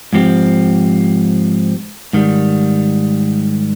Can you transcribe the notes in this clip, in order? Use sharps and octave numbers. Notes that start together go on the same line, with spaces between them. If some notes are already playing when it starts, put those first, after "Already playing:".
G#2 F3 C4 G4
G#2 D#3 G3